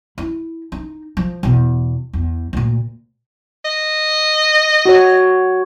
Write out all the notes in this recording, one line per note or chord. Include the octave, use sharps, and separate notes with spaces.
E4
D#4
F3
E2 B2
E2
D2 A#2
D#5
F#4 C#5